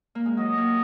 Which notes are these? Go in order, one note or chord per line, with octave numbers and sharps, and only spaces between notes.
A#3
G#3
F#3 D#5
A#3